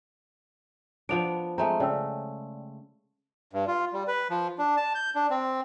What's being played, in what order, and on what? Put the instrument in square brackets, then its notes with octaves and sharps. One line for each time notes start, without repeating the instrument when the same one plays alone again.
[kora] F3 B3 D4 [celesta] D7 F7
[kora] G#3 A3 C4 [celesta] E5 A#5
[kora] C#3 [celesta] D5 G5 E6
[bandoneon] G2
F4
G3
B4
F3
D4
A5
G6
D4
C4